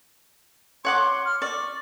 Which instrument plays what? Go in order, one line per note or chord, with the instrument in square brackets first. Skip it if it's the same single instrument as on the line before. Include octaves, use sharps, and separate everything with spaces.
[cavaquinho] C#5 F#5 D6 [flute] C6
[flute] F6
[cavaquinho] D5 [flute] C#6